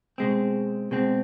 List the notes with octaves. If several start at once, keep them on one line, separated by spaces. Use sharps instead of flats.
B2 G#3 C4
B2 G#3 C4